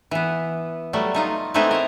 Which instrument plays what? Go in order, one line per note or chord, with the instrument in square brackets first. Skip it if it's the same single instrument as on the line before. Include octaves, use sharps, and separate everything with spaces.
[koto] E3 B3
F#3 G3 A3
A3 D#4 F4
G#3 A3 B3 C4 D#4 E4
A#4 A5